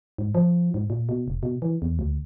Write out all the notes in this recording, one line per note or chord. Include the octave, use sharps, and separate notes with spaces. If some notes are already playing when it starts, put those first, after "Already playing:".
G#2
F3
G#2
A#2
B2
F1
B2
E3
E2
D2